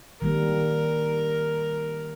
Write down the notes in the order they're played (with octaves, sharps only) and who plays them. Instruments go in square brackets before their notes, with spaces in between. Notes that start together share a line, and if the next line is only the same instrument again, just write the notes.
[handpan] D#3 G3 A#3 [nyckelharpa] A#4